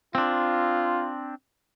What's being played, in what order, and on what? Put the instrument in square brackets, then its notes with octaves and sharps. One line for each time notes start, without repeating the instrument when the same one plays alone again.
[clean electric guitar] C4 D4 [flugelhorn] F4